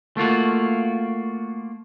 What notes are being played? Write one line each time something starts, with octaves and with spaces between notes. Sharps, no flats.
A3 A#3 F4 F#4